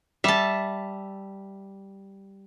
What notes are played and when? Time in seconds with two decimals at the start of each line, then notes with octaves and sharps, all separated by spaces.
0.24 G3 E5 A5